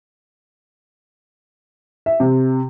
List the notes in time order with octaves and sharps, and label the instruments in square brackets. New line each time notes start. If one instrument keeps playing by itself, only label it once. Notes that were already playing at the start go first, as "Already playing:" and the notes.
[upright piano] E5
C3